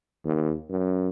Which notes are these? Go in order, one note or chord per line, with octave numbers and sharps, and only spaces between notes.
D#2
F#2